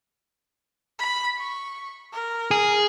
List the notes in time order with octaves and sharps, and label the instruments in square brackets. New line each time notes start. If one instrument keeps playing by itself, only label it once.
[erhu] B5
C#6
A#4
[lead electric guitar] G#4